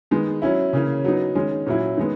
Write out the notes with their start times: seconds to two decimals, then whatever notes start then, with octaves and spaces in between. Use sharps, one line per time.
0.11 D#3 G#3 B3
0.42 F#3 C#4 E4
0.73 C#3 E3 A#3 C#4
1.04 F#3 B3 D#4
1.35 D#3 G#3 C#4
1.67 A#2 F#3 C#4 E4
1.97 D#3 G#3 B3